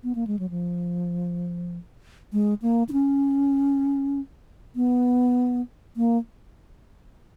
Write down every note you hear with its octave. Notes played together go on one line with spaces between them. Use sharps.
B3
A#3
G#3
F#3
F3
G#3
A#3
D#4
C#4
B3
A#3